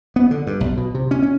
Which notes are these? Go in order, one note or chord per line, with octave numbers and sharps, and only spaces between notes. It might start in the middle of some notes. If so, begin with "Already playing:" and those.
B3
D3
G2
B1
B2
C3
C#4
C#4